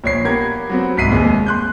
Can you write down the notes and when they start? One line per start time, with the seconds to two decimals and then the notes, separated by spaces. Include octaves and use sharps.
0.04 A#1 C#5 C7
0.24 A#3 B3 G4 A#5 G#6
0.70 F#3 B3 C4
0.97 C2 G#2 B6 C7 D#7
1.10 F1 D#2 G#3
1.46 C6 F#6 G6